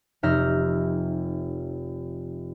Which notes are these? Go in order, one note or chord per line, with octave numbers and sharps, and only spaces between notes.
F1 D#4 E5 F6 G6 A#6